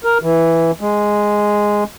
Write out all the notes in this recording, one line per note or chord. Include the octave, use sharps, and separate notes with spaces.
A#4
E3
G#3